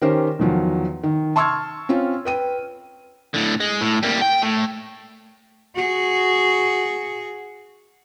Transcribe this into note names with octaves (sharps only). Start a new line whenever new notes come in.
D#3 C#4 G4 A#4 C5
E2 D#3 F3 F#3
D#3
A5 C6 C#6 E6 F6 G#6
C4 C#4 F4
B4 G5 D#7
A2 D3
G#3
A2
G3 A#3
G5
A2
F#4 G#4